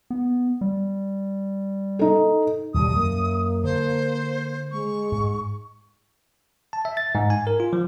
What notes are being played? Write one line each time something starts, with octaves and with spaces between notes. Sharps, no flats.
B3
G3
D#4 A4
D#2 B2 D3 G3 D#6
F#2 A#3
D3 C5
G#3 C#6
G#2
A5
E5
A6
G#2
G#5
A#4
F4
F3